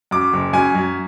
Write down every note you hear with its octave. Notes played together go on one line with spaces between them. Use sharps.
F#2 D6
F#1
F#2 G#5
F#2